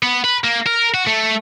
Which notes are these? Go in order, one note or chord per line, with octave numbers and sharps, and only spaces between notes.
B3
B4
A#3
A#4
F#4
A3